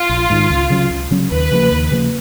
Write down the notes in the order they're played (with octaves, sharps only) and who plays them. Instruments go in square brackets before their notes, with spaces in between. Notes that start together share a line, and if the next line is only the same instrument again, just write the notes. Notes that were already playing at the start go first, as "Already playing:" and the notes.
Already playing: [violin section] F4
[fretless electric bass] A#1
G#2 D#3
C#2
C#3 F#3 C#4
C#2
C#3 F#3 C#4
[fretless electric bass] D#2 [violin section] B4
[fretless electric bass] C#3 F3 A#3
D#2
C#3 F3 A#3